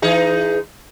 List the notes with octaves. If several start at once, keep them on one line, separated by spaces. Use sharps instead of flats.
E3 D#4 G#4